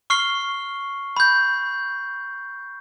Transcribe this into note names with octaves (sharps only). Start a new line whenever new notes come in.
C#6 F6 C7 G7
B5 G6